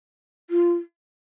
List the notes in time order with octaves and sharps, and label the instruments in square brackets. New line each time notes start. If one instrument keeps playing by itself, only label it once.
[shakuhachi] F4